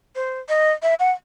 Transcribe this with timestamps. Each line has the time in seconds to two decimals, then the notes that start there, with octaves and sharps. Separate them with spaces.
0.16 C5
0.49 D#5
0.83 E5
1.00 F#5